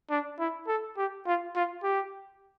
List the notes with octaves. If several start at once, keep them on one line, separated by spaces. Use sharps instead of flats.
D4
E4
A4
G4
F4
F4
G4